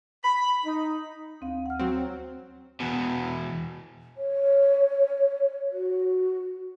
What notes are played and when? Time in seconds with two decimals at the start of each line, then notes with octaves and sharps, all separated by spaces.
0.24 B5
0.66 D#4
1.41 D2 C4 F5
1.66 F#5 F6
1.79 F#3 C4
2.80 E2 B2
4.17 C#5
5.72 F#4